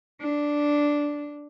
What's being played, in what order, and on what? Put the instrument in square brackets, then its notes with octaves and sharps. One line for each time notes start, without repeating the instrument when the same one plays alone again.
[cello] D4